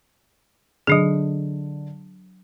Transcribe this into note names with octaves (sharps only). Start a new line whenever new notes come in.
D3 F#3 D4 G#4